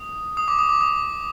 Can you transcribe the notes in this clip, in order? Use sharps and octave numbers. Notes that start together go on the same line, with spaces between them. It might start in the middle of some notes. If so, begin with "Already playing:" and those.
Already playing: D#6
D#6
D6
D#6
D6
D#6